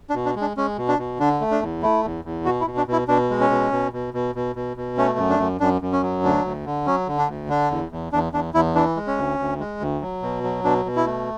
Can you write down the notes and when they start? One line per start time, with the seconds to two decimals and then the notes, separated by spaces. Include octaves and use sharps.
0.10 D4
0.14 B2
0.25 D4
0.36 G#3
0.41 D4
0.57 G#3 C#4
0.78 B2
0.88 D4
0.98 B2
1.20 D3 D4
1.41 A3
1.51 D4
1.61 E2
1.82 A3 E4
2.04 E2
2.25 E2
2.45 B2 F#4
2.61 E4
2.67 B2
2.77 D4
2.88 B2 E4
3.08 B2 D4
3.30 G#3
3.40 C#4
3.50 B2
3.72 B2
3.93 B2
4.14 B2
4.35 B2
4.56 B2
4.77 B2
4.97 A3 C#4
5.19 F#2
5.30 D4
5.39 F#2
5.60 F#2 D4
5.82 F#2
5.92 C#4
6.03 F#3
6.24 D2 D4
6.44 D2
6.66 D3
6.86 F#3 C#4
7.08 D3
7.18 D4
7.28 D2
7.49 D3 D4
7.71 E2
7.92 E2
8.13 E2 D4
8.33 E2 D4
8.54 E2 E4
8.75 E3 D4
8.96 G#3
9.07 C#4
9.17 D2
9.39 D2
9.60 G#3
9.80 D2
10.01 F#3
10.22 B2
10.43 F#3
10.64 B2 D4
10.85 B2
10.96 E4
11.06 A3